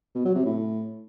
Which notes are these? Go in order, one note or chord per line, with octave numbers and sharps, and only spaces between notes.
B2
F#3
C3
A2